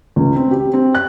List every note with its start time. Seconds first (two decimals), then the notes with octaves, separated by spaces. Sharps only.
0.16 C#2
0.36 C4
0.51 G4
0.74 C4
0.95 F#6